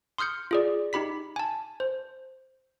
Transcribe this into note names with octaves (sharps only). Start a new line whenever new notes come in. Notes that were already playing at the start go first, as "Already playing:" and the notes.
C6 D#6 F6 G6 C#7
F4 G#4 D5
D#4 G4 B5 B6
G#5 A5
C5